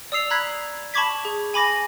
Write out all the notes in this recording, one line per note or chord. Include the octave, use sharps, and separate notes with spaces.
D5 D#6 E6 C7 F7
A#5 B5 F#6 G#6 B6
A5 B5 C#6 D6 G#6 B6
G#4
G#5 B5 D6 A#6